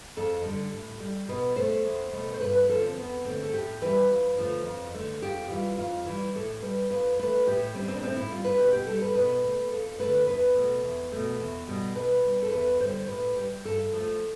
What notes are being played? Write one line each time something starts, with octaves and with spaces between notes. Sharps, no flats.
F2 A4
D3 G3
A2
G3
B2 B4
A3 C5
E2
B2 A3
C5
G2 B4
B4
D3 F3 A4
C4
E2 B3
D3 A3 C4
A4
A2 G4
E3 G3 B4
F2
D3 F3 A3
F2
D3 A3
F2 G4
E3 G3 F4
F2 F4
E3 G3
A2 A4
G3 B4
F2 B4
E3 A3 B4
A2 G4
G3 C4
D4
C4
D4
A2 C4
E4
G3 F4
B4
B2 G4
G4
G3 A4
B4
B2 B4
A3
F2 A4
D3 A3 B4
E2 B4
B2 A3
E2
B2 A3
E2
B2 G3
B2 B4
G3
A4
E2 B4
D3 G3 C5
A2 B4
G3 G4
G2 A4
F3 A3